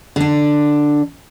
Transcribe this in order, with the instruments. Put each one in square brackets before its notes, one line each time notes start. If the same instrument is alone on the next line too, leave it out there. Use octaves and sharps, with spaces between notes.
[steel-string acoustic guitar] D3 D4